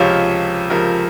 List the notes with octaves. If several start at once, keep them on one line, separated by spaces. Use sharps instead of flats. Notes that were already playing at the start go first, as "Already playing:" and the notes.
Already playing: C#2 C3 F3 C#5 F5
C#2 C3 F3 A#4